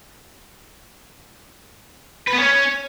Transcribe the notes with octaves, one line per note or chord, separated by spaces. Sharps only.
B4
B3
C#4